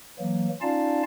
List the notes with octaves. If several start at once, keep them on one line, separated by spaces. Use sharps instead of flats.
E3 F#3 A#3
C#4 D#4 F4 D5 F5 A5